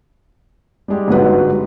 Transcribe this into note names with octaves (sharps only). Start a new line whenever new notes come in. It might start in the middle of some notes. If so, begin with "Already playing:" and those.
G3 G#3 G4
G1 G#2 F#3 B4